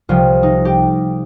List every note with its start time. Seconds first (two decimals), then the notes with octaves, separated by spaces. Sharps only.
0.09 C2 C3 F3 F4
0.43 D#4
0.65 G4